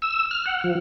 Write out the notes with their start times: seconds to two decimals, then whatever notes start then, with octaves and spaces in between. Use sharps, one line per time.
0.02 E6
0.31 F6
0.46 F#5
0.64 F3